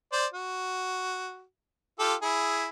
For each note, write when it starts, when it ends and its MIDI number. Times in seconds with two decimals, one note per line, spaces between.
0.12 0.26 72
0.12 0.26 74
0.34 1.43 66
1.99 2.14 65
1.99 2.14 67
1.99 2.14 69
2.22 2.68 64
2.22 2.68 68